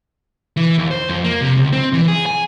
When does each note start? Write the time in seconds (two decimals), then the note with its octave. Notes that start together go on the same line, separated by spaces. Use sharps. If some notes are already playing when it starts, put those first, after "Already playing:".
0.57 E3
0.78 D#2
0.91 C5
1.09 F2
1.24 A#3
1.41 C3
1.55 C#2
1.72 C4
1.93 E3
2.08 G#4
2.26 G#5